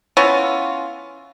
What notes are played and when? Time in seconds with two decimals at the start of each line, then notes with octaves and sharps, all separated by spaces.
0.17 E3 B3 C#4 F4